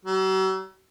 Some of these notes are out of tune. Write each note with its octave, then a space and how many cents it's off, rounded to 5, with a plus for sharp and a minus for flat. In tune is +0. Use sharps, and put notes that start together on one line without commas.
F#3 +45